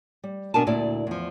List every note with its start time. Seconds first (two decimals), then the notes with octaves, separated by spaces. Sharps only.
0.24 G3
0.54 B2 D4 A#4 G#5 A5
0.67 D2 A#2 E4 D5
1.07 E2 F3